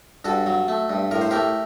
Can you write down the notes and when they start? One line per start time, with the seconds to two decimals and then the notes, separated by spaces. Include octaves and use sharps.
0.25 G2 F#4 A4
0.46 F#3
0.68 A3
0.90 G2
1.11 A2 A#4
1.21 C5
1.31 A3 G4 A#4